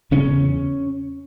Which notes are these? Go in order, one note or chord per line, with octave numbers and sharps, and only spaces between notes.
E2 C#3 C#4